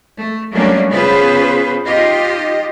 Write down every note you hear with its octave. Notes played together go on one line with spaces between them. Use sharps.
A3
F#3 G3 A3 A#3 C#4 D4
C#3 B3 F4 G#4 B4 C5
D#4 F4 G4 D#5